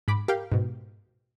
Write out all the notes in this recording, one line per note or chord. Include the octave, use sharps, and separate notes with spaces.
G#2 B5 D6
G4 A#4 F5 G5
G#2 B2